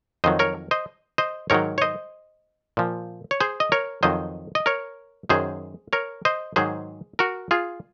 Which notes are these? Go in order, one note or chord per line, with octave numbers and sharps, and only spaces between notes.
F2 D#3 F#3 C5 D#5
A#4 C#5
C5 D#5
C5 D#5
G#2 D#3 F#3 A#4 C#5
C#5
C5 D#5
A#2 F3
C#5
G#4 C5
D#5
A#4 C#5
F2 D#3 F#3 C5 D#5
D#5
A#4 C#5
F#2 D#3 F#3 G#4 C5
A#4 C#5
C5 D#5
G#2 D#3 F#3 G#4 C5
F#4 A#4
F4 G#4